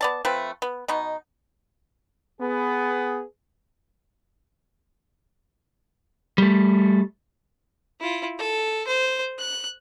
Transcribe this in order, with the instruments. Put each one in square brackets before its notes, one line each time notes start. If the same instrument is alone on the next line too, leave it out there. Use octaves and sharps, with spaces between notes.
[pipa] B3 D5 A5
F3 A3 C4 B4
B3
B2 B3 D#4
[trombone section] B3 G#4
[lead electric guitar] G3 A3
[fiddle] E4 F4
A4
C5
F#6